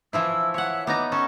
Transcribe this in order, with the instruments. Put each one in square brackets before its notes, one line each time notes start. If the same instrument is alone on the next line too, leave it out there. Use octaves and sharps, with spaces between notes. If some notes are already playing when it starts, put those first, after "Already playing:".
[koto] E3 F3 E4 [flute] E6
[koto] C#5 F#5 [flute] E5
[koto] B3 D#4 A#5 [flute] D6
[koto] C#4 A4 [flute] C#6